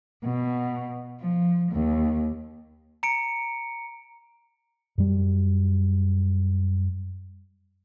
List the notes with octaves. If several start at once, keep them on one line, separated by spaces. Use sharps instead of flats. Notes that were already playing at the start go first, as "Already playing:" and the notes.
B2
F3
D#2
A#5 C#7 D7
F#2 G3